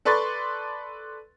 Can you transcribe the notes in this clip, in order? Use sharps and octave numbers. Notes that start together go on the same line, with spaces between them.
A4 B4 D5 C6 C#6 A6